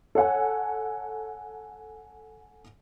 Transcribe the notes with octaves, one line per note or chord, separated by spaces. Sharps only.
A4 C#5 F#5 G#5